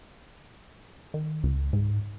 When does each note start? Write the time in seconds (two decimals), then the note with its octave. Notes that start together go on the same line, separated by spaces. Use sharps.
1.14 D#3
1.43 C#2
1.73 G#2